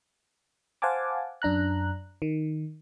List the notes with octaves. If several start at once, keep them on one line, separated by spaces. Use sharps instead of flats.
C5 F5 F#5 G#5 A5 D6
F#2 D4 A#5 F#6
D#3